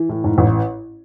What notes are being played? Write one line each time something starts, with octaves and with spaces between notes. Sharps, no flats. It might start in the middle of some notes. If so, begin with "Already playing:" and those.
Already playing: E3
A2
G#2
A1